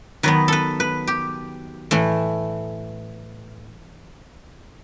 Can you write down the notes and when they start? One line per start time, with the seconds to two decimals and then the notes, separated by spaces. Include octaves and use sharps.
0.23 D#3 F#3 B3 B4
0.48 A4 B4
0.80 B4
1.07 G4
1.91 A2 E3 A3